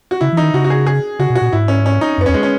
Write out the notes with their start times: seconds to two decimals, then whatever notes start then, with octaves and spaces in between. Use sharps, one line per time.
0.11 F#4
0.21 C#3 E4
0.32 E3
0.37 D#4
0.43 D#3
0.54 C#3 F#4
0.64 F#4
0.70 G#4
0.86 G#4
1.19 C#3 F#4
1.30 B2
1.35 F#4
1.42 A#2
1.53 G#2 E4
1.68 C#4
1.86 C#4
2.01 D#4
2.18 F#2
2.21 B3
2.26 C#4
2.29 E2
2.34 G#3
2.43 C#4